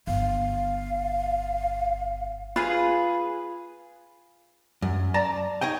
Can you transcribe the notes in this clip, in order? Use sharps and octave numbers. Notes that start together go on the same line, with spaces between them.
G1 F5
F4 G#4 B4
F#2
D5 A5 A#5
D#4 C#5 D#5 G5